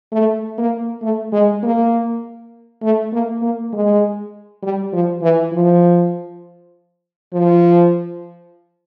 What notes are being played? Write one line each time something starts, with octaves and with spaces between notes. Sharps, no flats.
A3
A#3
A3
G#3
A#3
A3
A#3
A#3
G#3
G3
F3
E3
F3
F3